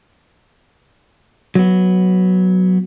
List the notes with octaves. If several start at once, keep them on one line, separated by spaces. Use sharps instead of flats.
F#3 B3